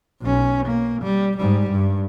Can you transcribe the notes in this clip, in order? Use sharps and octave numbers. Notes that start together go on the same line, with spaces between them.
B1 C#4
A#3
G3
G#2 G3
G2